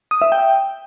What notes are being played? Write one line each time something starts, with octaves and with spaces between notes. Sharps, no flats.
D#6
E5
G5